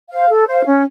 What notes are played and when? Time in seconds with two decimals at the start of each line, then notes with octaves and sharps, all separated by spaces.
0.10 C5 F5
0.29 A4
0.46 C5 F5
0.64 C#4